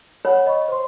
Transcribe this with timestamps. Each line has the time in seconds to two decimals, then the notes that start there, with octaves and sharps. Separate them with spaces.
0.25 C#5 F#5 B5
0.46 D#5 B5 C#6
0.68 C5 C6